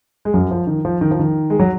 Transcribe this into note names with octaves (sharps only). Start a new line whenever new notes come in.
G#3
F#2 F#3
F3
D#3
F3
D#3
F3
D#3
G#3
F#3